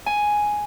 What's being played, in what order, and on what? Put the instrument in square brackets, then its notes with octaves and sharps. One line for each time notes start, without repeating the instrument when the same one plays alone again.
[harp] G#5